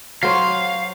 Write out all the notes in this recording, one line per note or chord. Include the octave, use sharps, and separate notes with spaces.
F#3 C5 C#5 F5